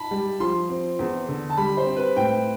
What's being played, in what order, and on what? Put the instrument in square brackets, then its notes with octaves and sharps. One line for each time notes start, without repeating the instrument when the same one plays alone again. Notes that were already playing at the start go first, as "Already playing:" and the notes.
Already playing: [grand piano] A5 B5
[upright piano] G3
[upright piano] F3 [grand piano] C6
[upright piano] C4
E2
D3
[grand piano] A5
[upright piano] G3 [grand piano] B5
[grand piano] C5
[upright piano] C4
[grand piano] B4
[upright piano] A2 [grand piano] G5